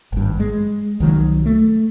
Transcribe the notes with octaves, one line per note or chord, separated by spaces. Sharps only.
G#1 G2
G#3
C2 D#3 F3 F#3
A3